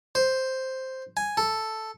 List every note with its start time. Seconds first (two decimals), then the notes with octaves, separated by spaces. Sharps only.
0.15 C5
1.17 G#5
1.37 A4